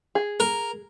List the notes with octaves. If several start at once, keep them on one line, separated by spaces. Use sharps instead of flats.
G#4
A#4